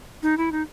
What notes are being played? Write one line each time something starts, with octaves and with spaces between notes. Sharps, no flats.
D#4
E4
D#4